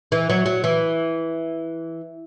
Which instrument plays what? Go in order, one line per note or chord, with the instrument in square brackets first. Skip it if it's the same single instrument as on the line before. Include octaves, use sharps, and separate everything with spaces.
[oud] E3
F#3
F#3
E3